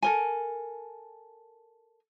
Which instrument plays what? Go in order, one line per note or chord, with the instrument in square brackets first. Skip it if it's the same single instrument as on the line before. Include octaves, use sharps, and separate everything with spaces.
[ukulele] A4 A#4 G#5